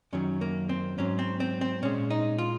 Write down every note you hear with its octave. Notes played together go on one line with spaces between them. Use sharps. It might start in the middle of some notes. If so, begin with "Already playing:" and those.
F#2 D#3 F#3 C#4
A#3
C4
G#2 F#3 C#4
C4
C4
C4
A#2 G#3 C#4
D#4
F4